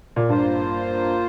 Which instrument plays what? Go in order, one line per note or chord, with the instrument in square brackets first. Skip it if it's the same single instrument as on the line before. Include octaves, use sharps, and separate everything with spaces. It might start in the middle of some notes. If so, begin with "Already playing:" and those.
[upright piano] A#2
[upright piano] G2 [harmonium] A#3 F4 C5